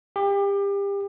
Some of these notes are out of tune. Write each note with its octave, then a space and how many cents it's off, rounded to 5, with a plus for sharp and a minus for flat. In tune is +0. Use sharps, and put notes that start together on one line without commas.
G4 +30